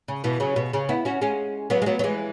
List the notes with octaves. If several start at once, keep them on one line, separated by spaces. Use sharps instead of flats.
C#3
B2 E3
C#3 F#3
B2
C#3
B3 E4
C#4 F#4
G#3 C#4
F#3 B3
G#3
F#3 B3
F#3
E3 G#3